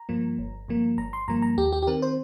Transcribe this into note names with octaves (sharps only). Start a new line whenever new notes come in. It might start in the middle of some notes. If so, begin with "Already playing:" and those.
Already playing: A#5
G2 F3 A#3
G1
G2 F3 A#3
G1 A#5
C6
G2 F3 A#3 A#5
A#5
D#2 G4
G4
G4
D#3 C4 A#4
C5